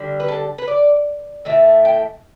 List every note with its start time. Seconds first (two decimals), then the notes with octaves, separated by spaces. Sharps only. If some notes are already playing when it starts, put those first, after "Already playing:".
Already playing: D3 G3
0.20 B4
0.28 A4
0.58 B4
0.68 D5
1.45 A2 E3 A3 E5
1.85 G5